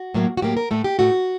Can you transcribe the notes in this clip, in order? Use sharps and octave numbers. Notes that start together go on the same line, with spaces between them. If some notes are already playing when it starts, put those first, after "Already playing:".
Already playing: F#4
A2 F#3 A#3
F#4
A2 F#3 A#3 G4
A#4
A2 A3 A4
G4
A2 A3 F#4